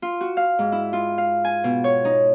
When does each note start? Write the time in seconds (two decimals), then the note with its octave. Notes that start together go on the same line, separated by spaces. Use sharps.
0.02 F4
0.21 F#4
0.37 F5
0.59 G#2
0.72 E4
0.93 F4
1.18 F5
1.45 G#5
1.64 B2
1.84 C#5
2.05 D#4